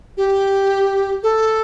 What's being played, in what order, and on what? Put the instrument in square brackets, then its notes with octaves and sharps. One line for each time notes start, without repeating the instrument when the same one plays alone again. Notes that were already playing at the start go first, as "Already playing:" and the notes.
[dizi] G4
A4